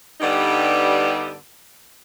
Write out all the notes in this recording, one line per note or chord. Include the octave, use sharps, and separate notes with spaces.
G2 D3 G3 B3 D#4